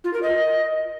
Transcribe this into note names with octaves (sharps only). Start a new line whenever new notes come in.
F4
A#4
D#5